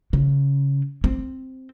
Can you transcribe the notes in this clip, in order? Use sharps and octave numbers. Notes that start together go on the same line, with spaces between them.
C#3
C4